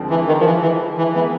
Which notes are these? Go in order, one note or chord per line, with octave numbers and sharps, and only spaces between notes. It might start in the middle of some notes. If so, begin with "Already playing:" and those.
Already playing: D#2 D3 F3 G#3 C4
E3
D#3
F3
E3
E3
E3
D#3 E3 G#3 B3